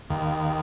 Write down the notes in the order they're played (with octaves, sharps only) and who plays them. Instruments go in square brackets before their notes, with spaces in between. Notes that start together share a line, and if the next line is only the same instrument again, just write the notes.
[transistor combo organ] D#2